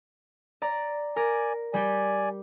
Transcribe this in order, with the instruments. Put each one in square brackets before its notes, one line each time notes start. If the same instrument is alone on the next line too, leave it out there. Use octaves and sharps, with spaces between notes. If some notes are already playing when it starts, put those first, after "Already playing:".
[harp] D5 A#5
[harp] A#4 [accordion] D5 G#5
[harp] G3 G4 [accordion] D5 G#5